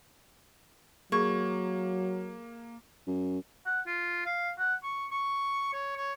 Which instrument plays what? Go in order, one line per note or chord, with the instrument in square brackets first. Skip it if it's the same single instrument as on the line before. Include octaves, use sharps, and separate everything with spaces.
[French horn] F#3 [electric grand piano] A#3 [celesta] G#4 G#6 [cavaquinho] C#6
[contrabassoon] F#2
[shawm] F#5
F4
F5
F#5
C#6
C#6
C#5
C#5